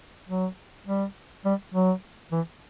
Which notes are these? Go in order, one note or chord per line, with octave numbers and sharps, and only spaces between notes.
F#3
G3
G3
F#3
E3